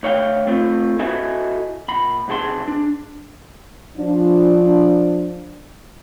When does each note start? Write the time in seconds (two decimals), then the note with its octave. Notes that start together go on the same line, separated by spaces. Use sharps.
0.03 D2 C#5 F5 G5
0.47 A3 C4 F4
0.99 E4 F#4 A4 D#5 E5 G#5
1.88 A#2 B5
2.28 B1 C3 G#4 A5 C6
2.68 D4
3.97 F3 D4